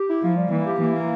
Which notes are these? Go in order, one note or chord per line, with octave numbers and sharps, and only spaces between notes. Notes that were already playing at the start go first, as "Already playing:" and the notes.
Already playing: G4
E4
F3 A#3
G3
E3 A#3
G4
E3 A#3
A#3